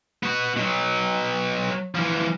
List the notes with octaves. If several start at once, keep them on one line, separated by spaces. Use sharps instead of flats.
B3 F#4
B2 F#3
E3 F3